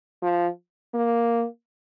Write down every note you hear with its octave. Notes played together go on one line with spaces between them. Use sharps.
F3
A#3